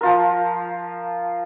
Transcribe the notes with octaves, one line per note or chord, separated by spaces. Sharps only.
F3 F4 A#4